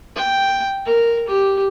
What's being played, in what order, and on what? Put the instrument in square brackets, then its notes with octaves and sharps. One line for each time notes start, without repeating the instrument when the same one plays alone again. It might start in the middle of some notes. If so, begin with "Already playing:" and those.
[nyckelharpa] G5
A#4
G4